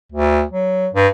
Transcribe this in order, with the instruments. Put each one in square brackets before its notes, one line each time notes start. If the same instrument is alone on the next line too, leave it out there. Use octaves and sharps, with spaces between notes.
[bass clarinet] D2
F#3
G2